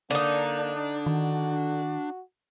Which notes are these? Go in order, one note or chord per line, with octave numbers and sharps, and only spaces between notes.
D3 A#3 D4 D#4
D#3 F#4